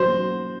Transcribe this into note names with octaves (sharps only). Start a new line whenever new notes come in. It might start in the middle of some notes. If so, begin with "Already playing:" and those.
Already playing: F#3 F#4 C5
A#3